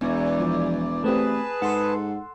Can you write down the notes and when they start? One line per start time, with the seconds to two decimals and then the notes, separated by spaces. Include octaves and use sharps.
0.01 E1 E2 E3 D5
0.40 F3
1.04 A3 C4 G4 G#4 B4 A5
1.62 G#2 A4 F#5 C6